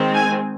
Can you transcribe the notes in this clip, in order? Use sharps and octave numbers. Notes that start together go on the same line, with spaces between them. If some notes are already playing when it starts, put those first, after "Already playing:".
Already playing: D#3 G#3 C4
G#5